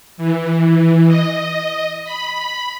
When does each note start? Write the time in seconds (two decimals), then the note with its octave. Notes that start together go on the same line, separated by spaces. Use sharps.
0.17 E3
1.07 D#5
2.05 B5